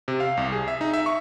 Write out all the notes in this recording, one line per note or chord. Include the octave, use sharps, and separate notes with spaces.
C3
F5
C2
G#4
E5
D#4
E5
C#6